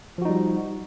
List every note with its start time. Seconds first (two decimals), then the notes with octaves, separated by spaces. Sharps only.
0.18 F3
0.22 F#4
0.25 D#4
0.29 G3